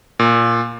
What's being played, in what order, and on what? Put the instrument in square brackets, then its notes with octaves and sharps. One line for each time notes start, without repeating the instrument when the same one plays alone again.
[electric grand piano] A#2